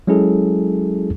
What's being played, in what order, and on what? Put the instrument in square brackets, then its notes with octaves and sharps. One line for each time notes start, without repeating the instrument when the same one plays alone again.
[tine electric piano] F#3 G#3 C#4 E4 G#4 A4